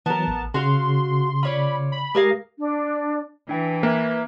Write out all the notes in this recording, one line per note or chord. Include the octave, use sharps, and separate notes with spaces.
E3 F#3 B3 A#4 A5
A1
C#3 F#4 F5 C6
F4 C#5 D5 B5
B5
G#3 G4 G#4 A#4 F5 A#6
D4
E3 D4 G5
A#3 B4 E5 G#6